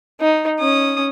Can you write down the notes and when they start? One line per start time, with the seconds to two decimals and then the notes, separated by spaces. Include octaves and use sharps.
0.21 D#4
0.59 C#4 D#6